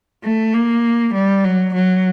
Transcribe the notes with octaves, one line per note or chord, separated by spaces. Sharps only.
A3
A#3
G3
F#3
F#3